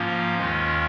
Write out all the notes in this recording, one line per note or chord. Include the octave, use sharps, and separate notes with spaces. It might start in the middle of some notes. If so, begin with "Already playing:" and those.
Already playing: G#2 F3 A#3 C#4 F4
D#2 D#3 G#3 C#4 F4